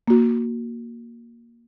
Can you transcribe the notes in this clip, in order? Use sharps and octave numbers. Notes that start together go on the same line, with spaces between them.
A#3 F#4